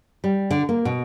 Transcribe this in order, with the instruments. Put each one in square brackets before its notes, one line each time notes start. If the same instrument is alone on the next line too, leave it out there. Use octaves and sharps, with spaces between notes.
[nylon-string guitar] G3
D3
A#3
B2